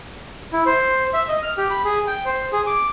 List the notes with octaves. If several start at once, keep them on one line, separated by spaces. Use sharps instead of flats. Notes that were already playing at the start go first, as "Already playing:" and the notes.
E4
C5
E5
D#5
F6
G4
B5
G#4
G5
C5
G#4
D6